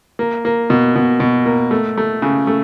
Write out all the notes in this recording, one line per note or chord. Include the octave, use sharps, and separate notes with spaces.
A#3
A#3
B2
B2
B2
A#3
A3
A3
C#3
A3